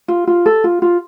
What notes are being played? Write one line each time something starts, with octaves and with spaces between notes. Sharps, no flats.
F4
F4
A4
F4
F4